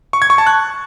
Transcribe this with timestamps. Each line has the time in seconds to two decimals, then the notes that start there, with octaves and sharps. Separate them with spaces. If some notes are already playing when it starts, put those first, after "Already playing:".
0.13 C#6
0.22 G#6
0.30 C#6
0.38 A5
0.47 F#6